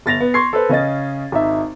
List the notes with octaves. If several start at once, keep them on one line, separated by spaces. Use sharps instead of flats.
G1 A6 A#6 F7
B3
C6 C#6 G#6 C7
A4 B4 C5
C#3 C#4 D#5 A6
G#1 D#4 E5